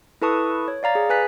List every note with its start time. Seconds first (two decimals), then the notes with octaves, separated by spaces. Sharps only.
0.22 E4 A4 B4 A5 C#6 D#6
0.68 C#5
0.83 D5 F5 A#5 A6
0.95 G#4
1.10 B4 G#5 F#6 B6